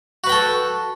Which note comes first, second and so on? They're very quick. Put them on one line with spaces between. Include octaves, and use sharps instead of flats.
F#4 B4 G5 A4